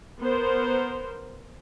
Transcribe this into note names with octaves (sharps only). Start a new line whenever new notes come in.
B3 A#4 C5